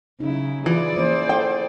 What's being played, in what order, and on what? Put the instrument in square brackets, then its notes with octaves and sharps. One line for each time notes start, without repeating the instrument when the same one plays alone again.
[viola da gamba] C#3 F#3 E4 [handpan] C#4 D#4
[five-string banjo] E3 [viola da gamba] E4 G#4 D5 [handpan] F4
[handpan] F3 A#3 C#4 [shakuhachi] C5
[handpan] A4 [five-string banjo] G5